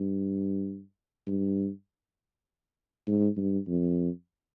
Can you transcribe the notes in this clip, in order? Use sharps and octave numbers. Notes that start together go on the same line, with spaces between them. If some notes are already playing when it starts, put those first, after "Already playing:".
Already playing: G2
G2
G#2
G2
F2